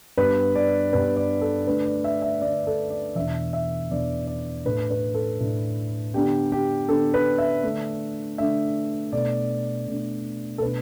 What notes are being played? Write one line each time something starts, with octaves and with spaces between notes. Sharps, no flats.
G2 G3 B3 D4 B4
D5
G2 G3 B3 D4 B4
D5
A4
D3 A3 D4 B4
D5
E5
E5
D3 A3 D4 D5
A4
D5
E2 B2 B3 D4 E5
E5
E2 B2 B3 D4 D5
D5
A2 A3 D4 B4
B4
A4
A2 A3 D4
D3 B3 D4 G4
G4
D3 B3 D4 A4
B4
E5
D3 A3 D4
D3 A3 D4 E5
B2 A3 D4 D5
B2 A3 D4
A4
B2 A3 D4 B4